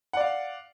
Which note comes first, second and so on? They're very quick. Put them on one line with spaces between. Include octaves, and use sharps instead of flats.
F#5 D5 F5